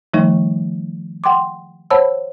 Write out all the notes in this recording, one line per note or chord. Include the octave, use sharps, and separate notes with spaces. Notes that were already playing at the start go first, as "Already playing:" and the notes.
D#3 F3 G3 A3 D#4
F#5 G5 C6 D6
C5 C#5 F#5 A5 B5 E6